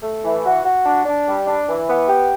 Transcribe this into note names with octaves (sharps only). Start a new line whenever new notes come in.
A3
E3
F#4
F#4
D4
D4
G3
D4
E3
B3
G4